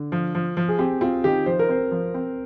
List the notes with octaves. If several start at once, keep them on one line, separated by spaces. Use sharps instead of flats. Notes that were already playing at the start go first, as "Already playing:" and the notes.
Already playing: D3
F3
F3
F3
G#4
C4 G4
C4 F4
D#3 G4
F3 C5
A#4
C4 C5
F3
C4